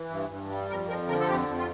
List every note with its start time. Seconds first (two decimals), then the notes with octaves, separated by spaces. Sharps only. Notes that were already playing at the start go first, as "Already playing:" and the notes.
Already playing: E3
0.09 G2
0.30 G2
0.50 G3
0.69 F2 A#4
0.88 F3 A#4
1.08 D3 A#4
1.20 A4
1.28 F2 G4
1.48 F2
1.58 F4